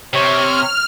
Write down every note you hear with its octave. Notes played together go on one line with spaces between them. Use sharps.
C3 C#5 F6